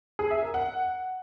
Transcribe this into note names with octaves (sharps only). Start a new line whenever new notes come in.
G#4
E5
A#4
F#5